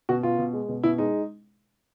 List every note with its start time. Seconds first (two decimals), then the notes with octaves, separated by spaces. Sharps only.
0.09 B2 F#4
0.23 B2 F4
0.38 B2
0.53 G#3
0.69 B2
0.83 B2 E4
0.98 G#3 D#4